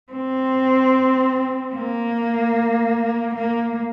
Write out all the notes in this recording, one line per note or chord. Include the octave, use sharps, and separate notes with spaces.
C4
A#3
A#3